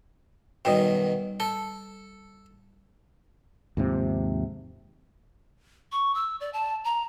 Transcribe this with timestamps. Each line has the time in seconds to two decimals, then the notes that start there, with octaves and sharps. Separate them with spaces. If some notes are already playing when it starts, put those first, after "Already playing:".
0.65 F#2 B2 D#3 G3 G5
1.40 A4 A5
3.77 D#2 G#2 C3 F3
5.92 C#6
6.14 E6
6.40 D5
6.53 A5
6.84 A#5